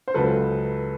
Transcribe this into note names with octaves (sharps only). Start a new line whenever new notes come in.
C5
C#2 C#3 F#3 A4 B4